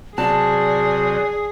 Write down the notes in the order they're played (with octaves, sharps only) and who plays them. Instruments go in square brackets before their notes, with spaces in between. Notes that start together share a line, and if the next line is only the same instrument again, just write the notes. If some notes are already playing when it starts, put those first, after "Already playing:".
[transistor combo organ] C3 F#3 [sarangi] G#4 [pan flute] D5 [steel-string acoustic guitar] A5